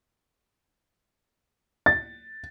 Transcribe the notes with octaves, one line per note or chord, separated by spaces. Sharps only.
A6